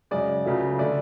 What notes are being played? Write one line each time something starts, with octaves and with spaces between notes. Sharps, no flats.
F#2 C#3 G#3 D5
C#2 C#3 F#3 A3
D3 A3 D5